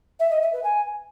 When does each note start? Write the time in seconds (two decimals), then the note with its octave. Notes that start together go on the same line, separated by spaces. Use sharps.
0.19 E5
0.30 D#5
0.41 E5
0.52 B4
0.63 G#5